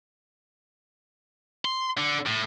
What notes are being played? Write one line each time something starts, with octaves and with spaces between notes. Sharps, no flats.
C6
D3
A2